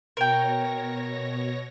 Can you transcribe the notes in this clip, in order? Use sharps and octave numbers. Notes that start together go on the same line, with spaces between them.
B2 A#4 C#5 G5 A#6